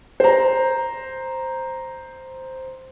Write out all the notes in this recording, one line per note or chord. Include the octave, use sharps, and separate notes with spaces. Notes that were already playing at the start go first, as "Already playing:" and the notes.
C5 A#5